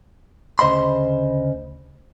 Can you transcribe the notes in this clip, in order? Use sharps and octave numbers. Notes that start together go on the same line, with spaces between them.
D2 C#3 C5 D#5 B5 C6